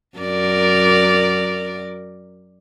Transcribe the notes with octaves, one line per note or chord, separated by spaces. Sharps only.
F#2 A#4 D5